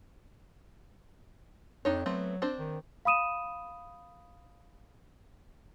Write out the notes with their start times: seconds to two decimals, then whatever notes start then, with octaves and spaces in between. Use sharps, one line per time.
1.85 F2 D4 D#4 C#5
2.06 F#3 A3 B3 C4
2.42 C4 D4 C5
2.59 D#3
3.05 F5 B5 D#6 D#7 E7